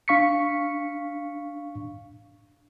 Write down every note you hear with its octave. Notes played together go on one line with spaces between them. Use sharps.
D4 F5 C#6 B6 C#7